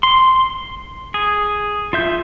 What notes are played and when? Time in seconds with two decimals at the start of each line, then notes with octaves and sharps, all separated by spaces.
0.03 C6
1.14 G#4
1.93 F4 E5 G6